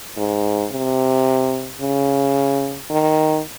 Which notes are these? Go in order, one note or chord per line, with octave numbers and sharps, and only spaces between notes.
G#2
C3
C#3
D#3